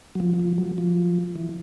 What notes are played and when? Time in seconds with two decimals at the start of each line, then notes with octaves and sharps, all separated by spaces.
0.15 F#3
0.20 F3
0.39 F3
0.58 F#3
0.78 F3
1.36 E3